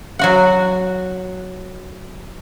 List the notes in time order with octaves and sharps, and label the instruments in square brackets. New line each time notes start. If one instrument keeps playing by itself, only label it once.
[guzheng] F#3 F#4 F#5